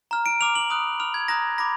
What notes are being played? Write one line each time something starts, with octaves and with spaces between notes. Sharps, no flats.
A#5 F6
D7
A#5 D6 F6 F7
F#7
B5 D#6 F#6
B5 D6 F6 F7
G#6
A#5 D#6 F#6 A#6
B5 D6 A#6